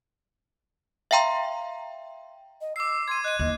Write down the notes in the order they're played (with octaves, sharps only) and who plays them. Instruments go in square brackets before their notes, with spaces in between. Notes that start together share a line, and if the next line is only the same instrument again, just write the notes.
[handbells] E5 F5 G5 A#5 C6
[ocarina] D#5
[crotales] D6 C7 [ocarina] E6
[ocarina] C6 [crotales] G#6 D#7
[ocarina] D#5 [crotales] F#6 D#7
[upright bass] D#2 [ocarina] D#5